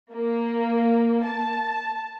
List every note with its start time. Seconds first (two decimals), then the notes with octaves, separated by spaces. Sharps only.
0.12 A#3
1.24 A5